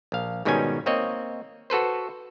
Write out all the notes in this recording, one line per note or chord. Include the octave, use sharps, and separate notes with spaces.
A#1 F5
G#2 B2 D#3 G3 C#4 G#5
A#3 C4 C#5 D#5
F#4 A4 B4 C5